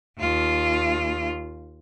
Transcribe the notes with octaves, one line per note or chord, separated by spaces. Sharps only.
D#2 F4